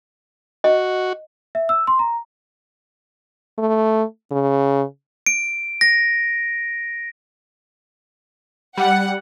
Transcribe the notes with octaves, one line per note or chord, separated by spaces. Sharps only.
F#4 D#5
E5
E6
C6
A#5
A3
C#3
D7
A#6
G3 F#5